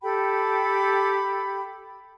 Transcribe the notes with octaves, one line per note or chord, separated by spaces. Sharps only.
G4 A4 G5 B5